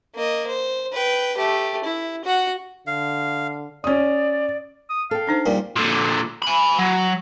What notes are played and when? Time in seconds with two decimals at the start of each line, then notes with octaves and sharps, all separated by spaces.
0.15 A#3 D#5
0.48 C5
0.92 B4 G5
1.37 A3 G4
1.85 E4
2.25 F#4 F#5
2.87 D3 F5
3.84 C#4 D5 D#6
4.90 D#6
5.11 A4 F5 G5
5.27 D4 D#4 C5
5.46 A#1 A#2 G3
5.76 A#2 D3
6.42 G#5 B5
6.79 F#3